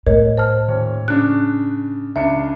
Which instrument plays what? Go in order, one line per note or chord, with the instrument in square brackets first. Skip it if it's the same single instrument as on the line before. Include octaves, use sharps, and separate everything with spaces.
[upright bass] A2 [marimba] A#4 C#5 D#5
[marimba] C5 A5 F6
[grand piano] D#1 C#5
[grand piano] C#3 D4 [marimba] F#6
[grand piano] C#2 D4 C#7 [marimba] E5